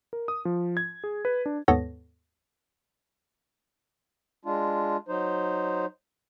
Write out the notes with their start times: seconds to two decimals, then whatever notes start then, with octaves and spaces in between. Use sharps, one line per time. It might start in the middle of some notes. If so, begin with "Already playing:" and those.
0.13 A#4
0.28 D#6
0.45 F3
0.77 G#6
1.04 G#4
1.25 B4
1.46 D4
1.68 D#2 G#2 B3 A4 C#5 A#6
4.45 G#3 D4 F4
5.08 F#3 D#4 C5